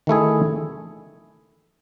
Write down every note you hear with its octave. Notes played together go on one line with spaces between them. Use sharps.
D#3 A3 E4 G#4